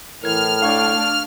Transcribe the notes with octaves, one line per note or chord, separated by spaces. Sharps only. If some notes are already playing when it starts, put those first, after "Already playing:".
A2 E3 A#4 F6 G#6
A3 D4 F5 C#6 G#6